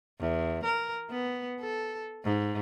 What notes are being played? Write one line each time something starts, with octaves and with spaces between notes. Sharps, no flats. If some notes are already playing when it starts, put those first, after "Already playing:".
E2
A#4
B3
A4
G#2